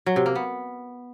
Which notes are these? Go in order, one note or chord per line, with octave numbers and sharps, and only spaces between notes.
F#3
C3
A#3
B3